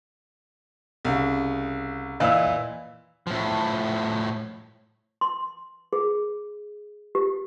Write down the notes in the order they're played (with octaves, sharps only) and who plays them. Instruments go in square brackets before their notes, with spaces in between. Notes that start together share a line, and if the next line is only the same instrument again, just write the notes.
[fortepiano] C2 C#3
[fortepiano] A#2 E3 [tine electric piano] D#5 F5 E6
[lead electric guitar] A2 F3
[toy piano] C6
G#4
G4